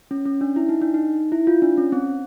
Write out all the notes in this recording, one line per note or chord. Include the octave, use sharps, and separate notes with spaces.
C#4
C#4
D4
E4
D#4
D4
D#4
E4
F4
D4
C#4
C4